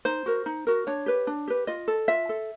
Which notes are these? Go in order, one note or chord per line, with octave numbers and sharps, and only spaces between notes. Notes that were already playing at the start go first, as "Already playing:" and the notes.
D#4 C5
F#4 A#4
D#4
F#4 A#4
D4 C#5
G4 B4
D4
G4 B4
F4 D#5
A4
F4 E5
A4